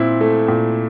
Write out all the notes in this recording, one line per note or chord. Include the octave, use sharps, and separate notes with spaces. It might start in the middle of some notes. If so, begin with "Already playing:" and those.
Already playing: A#2 C4 E4
A3
A#2